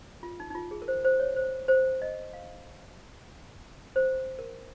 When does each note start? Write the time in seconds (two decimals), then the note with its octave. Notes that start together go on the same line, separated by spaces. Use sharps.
0.23 F4
0.40 D#4
0.50 D#4
0.55 F4
0.71 G#4
0.82 A#4
0.88 C5
1.05 C5
1.20 C#5
1.36 C5
1.68 C5
2.02 D#5
2.33 F5
3.96 C5
4.39 A#4